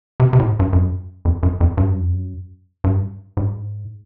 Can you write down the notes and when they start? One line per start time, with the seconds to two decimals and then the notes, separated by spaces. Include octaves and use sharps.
0.20 C3
0.33 C3
0.39 A2
0.46 G#2
0.59 G2
0.73 F#2
1.25 F2
1.43 F#2
1.60 F2
1.77 G2
1.90 F#2
2.00 F2
2.13 F#2
2.84 G2
3.37 G#2